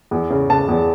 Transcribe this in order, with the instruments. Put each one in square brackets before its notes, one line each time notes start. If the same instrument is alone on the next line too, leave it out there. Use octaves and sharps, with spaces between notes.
[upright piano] E2
C#3
C#3 A5
E2